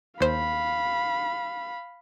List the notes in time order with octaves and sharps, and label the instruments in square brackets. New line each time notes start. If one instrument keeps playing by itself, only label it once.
[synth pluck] D#2 C5 [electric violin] F5 B5